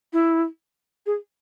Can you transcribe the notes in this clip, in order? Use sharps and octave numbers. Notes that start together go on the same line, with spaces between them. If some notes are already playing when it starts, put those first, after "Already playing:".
E4
G#4